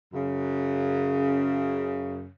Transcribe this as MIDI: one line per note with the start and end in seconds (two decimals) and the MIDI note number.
0.13 2.28 42
0.13 2.28 49